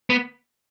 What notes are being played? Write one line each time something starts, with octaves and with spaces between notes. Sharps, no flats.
B3